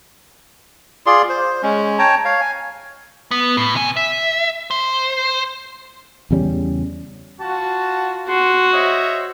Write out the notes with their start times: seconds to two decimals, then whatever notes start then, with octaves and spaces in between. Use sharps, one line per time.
1.06 F4 G#4 D5 C6
1.29 C5
1.63 G#3 C#4
1.99 C#5 G5 A5 A#5
2.25 C#5 F5
2.41 G#5
3.31 B3
3.57 A2
3.75 C3 G#5
3.96 E5
4.71 C5
6.31 E2 C#3 G3 C#4
7.40 F4 F#4 A5
8.28 F#4 C6
8.73 C5 C#5 D#5 E5